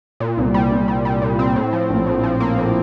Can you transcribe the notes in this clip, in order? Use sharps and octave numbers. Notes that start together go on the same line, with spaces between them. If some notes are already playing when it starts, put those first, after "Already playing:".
A#2
C2
G3
C2
G3
G3
A#2
C4
A2
F3
A#1
A2
F3
A#3
A2